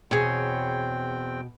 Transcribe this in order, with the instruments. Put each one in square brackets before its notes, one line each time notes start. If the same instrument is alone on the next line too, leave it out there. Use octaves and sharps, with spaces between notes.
[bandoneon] E2 C4 G5 [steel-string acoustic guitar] B2 [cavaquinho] G#4 C#5